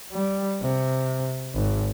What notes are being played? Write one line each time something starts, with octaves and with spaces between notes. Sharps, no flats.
G3
C3
G#1